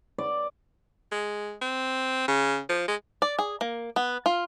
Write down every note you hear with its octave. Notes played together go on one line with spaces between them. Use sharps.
D5
G#3
C4
C#3
F3
G#3
D5
G#4
A#3
B3
F4